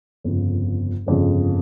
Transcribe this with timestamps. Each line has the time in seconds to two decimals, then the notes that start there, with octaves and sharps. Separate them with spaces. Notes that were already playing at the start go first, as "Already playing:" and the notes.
0.24 G1 F2 C#3
1.06 G1 F2 C#3